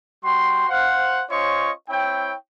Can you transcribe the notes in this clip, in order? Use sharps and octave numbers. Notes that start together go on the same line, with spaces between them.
G3 F#4 G5 C6
C5 F5 F#5
C#4 F4 C5 C#5 D#5 C#6
C4 E4 C#5 G5